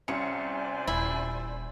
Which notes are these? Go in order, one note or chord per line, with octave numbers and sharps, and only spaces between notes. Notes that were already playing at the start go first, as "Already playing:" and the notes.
C2 F3 C#4 C5 D5 G#5 C#7
D#1 E4